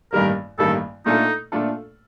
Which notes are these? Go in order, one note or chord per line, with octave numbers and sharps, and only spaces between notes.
A1 G2 D#3 G3 A#3 A#4
A1 G2 D#3 G3 A#3 A4
A#2 A3 D4 D#4 F4 A4
A#2 A3 D4 F4 A4